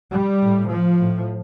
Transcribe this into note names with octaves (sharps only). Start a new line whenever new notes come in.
G3
A2
F3
A2